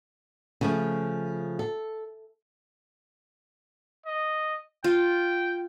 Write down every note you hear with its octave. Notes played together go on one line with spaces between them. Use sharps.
C#3 F3 A3
A4
D#5
F4 G5